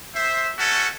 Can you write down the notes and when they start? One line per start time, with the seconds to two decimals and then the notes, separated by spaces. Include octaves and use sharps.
0.15 C5 E5
0.58 A3 C#4 F#4 A4